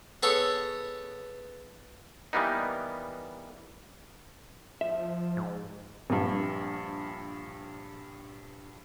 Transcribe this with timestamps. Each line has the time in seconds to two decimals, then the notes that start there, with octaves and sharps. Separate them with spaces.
0.23 B3 G#4 A4 C#5
2.33 E3 G3 A#3 B3 D#4
4.81 F3 E5
5.37 G#2
6.10 A#1 G2